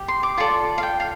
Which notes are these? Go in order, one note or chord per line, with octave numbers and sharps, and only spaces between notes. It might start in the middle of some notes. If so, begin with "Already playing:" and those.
Already playing: G4
C6
D6
F4 A4 D5 C6
F5
G5
F5